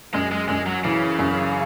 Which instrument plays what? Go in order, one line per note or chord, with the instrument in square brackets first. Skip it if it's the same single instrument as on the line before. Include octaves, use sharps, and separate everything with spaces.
[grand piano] F#2 [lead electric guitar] G#3
[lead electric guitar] G#3
[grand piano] F#2 [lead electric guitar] G#3
[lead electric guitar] F#3
[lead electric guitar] C#3 [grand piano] E3
[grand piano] F#2